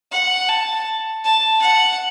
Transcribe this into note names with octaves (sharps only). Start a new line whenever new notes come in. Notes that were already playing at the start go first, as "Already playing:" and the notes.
F#5
A5
A5
F#5